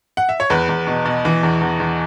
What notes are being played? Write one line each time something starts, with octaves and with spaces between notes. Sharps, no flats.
F#5
E5
C#5
E2 B4
E2
B2
B2
E3
E2
E2
E2